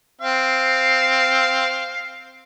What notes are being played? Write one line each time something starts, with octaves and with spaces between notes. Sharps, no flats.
C4 F5